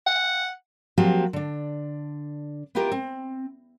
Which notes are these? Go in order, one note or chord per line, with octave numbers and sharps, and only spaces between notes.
F#5
F3 F#3 A#3 C4 F#4 G4
D3 D4
B3 E4 F4 G4 A#4
C4